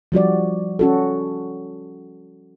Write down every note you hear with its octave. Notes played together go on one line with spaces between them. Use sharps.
F3 G3 F#4 D5
C#4 F#4 A4